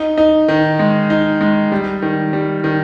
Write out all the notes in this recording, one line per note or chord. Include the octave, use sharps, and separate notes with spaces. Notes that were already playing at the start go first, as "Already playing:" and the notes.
Already playing: D#4
D#4
D#3
G#3
D#4
G#3
G3
D#3
G3
D#3